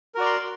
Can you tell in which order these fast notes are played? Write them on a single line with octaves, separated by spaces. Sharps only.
A#4 F#4 D5 A#5 C6